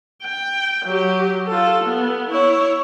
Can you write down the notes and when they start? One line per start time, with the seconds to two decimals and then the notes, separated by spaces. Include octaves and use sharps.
0.23 G5
0.85 F#3 G4
1.47 F4 A4
1.84 B3
2.30 E4 C#5